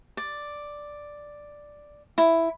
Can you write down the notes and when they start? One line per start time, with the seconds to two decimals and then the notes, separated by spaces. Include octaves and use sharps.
0.17 D5
2.18 E4